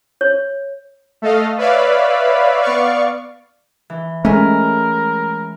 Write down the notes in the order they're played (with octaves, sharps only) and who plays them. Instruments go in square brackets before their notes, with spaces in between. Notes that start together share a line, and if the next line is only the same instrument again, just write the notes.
[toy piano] C#5
[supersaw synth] A3 A4 D#5 F5
B4 C#5 D5 E5 F5 B5
B3 D5 F5 C#6
[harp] E3
[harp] G#3 E4 [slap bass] A3 [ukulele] C#4 G#5 [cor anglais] A#4